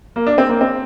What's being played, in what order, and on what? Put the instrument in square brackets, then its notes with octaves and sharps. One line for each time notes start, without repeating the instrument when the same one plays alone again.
[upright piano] A#3
D4
C4
A#3
C4